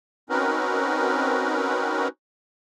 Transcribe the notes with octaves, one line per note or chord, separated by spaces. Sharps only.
C4 C#4 D#4 F#4 A#4 B4